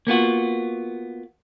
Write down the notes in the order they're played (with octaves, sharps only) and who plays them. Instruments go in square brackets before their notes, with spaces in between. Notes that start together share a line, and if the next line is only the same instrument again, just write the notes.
[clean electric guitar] A#3 B3 F4 F#4